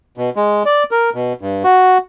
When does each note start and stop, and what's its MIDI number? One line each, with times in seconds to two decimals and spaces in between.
0.17 0.30 47
0.36 0.63 56
0.66 0.83 74
0.91 1.10 70
1.15 1.33 47
1.41 1.63 43
1.64 1.98 66